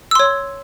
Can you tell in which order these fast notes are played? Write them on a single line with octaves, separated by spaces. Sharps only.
E6 C6 C#5